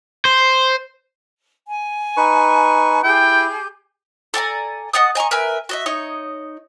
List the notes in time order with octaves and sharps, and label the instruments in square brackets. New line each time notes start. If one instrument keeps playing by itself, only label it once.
[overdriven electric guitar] C5
[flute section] G#5
[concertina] D#4 B4 C#6
[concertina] E4 [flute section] G4 G#4 G6 [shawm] G5
[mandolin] A4 D5 G#5 A#5
D#5 F#5 A5 D#6
D#5 G#5 A#5 C#6
A#4 B4 E5 G#5
F#4 D#5 E5
D#4 C#5 D#5